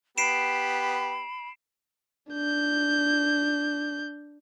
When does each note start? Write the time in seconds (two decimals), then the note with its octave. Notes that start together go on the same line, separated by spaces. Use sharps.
0.18 B3 G4 B5 C7 D7 E7
2.31 D4 G6